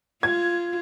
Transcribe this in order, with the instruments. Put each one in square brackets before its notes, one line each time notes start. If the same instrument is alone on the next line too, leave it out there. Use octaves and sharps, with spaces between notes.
[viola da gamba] F4 [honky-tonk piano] G#6